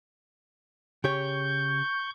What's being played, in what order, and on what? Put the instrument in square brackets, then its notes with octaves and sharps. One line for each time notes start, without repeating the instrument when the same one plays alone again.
[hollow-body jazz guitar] C#3 G4 C#5 [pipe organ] C#6 G6